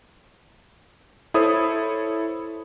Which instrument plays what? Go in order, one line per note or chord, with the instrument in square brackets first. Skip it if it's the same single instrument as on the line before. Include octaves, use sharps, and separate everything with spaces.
[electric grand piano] E4 A4 C5 C#5 D#6